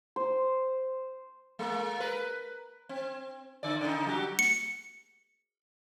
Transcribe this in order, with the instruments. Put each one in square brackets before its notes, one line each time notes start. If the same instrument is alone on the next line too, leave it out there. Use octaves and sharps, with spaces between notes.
[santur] C5
[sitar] G#3 A#3
A#4 B4
C4
D3 D5
C#3 D#4
F#3 F#4 G4
[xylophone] C#7